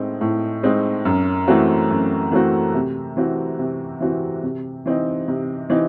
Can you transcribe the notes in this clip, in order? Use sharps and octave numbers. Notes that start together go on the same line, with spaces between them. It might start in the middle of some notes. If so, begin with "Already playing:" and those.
Already playing: A2 G#3 C4 D#4
A2
G#3 C4 D#4
F#2
E3 A3 C4 F#4
F#2
E3 A3 C4 F#4
C3
E3 C4 F#4
C3
E3 C4 F#4
C3
E3 C4 D#4
C3
E3 C4 D#4